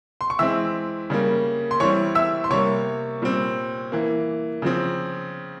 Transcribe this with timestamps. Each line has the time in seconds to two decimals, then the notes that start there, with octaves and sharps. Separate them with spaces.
0.21 C6
0.30 C#6
0.39 E3 G#3 C4 E5 E6
1.10 C#3 G3 A#3
1.71 C6
1.80 E3 G3 C4 C#5 C#6
2.15 E5 E6
2.44 C6
2.50 C3 G3 A#3 C#5 C#6
3.22 A#2 G3 C4
3.92 E3 A#3
4.62 C#3 F3 C4